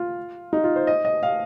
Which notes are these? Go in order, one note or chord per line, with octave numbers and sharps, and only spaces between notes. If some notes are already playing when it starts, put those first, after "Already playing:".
Already playing: F4
D#4
F4
C5
D#5
D#5
F5